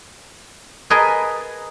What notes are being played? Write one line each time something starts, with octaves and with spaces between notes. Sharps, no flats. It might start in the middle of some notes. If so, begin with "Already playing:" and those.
G#4 A#4 B4 D#5 G#5 A5